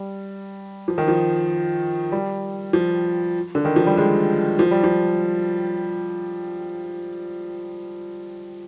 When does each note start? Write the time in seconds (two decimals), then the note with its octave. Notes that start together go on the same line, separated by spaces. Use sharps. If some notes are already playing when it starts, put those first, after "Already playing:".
Already playing: G3
0.88 F3
0.98 D#3
1.08 F3
2.12 G3
2.73 F3
3.55 D3
3.65 D#3
3.76 F3
3.87 G3
3.97 G#3
4.59 F3
4.71 G3
4.84 F3